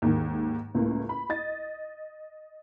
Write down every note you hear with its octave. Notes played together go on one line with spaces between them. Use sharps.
D#2 G#2 D#3
C#2 A2 A#3
B5
D#5 A6